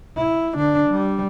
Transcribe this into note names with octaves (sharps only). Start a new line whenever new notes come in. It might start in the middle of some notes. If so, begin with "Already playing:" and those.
E4
D3 D4
G3